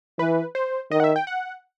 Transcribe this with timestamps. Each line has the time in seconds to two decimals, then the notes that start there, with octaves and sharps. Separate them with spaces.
0.19 E3 B4
0.55 C5
0.91 D#3 D#5
1.00 F#5
1.04 E5
1.16 G5
1.27 F#5